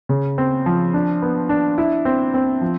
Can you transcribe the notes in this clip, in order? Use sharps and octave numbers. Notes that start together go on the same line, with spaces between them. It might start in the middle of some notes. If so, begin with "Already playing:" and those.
C#3
C4
F3
D4
B3
D4
E4
C4
C4
F3